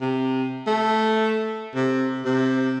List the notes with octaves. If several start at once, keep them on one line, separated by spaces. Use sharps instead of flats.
C3
A3
C3
C3